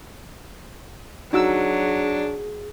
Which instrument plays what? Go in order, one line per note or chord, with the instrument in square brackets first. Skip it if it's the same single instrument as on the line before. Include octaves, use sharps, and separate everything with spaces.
[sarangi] F#3 [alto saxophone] D4 [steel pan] D#4 F#4 E6 [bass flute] G#4